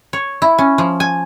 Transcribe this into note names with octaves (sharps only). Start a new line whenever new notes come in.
C#5
E4
C#4
F3
G#5